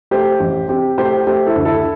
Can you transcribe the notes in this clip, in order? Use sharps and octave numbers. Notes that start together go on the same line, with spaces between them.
A3 G4 C5
A1
C4 G4
A2 G4 C5
A3 G4 C5
E4 A4
D2
E4 A4